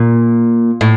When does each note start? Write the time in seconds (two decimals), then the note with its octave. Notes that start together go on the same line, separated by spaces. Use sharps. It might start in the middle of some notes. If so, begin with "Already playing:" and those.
Already playing: A#2
0.81 A2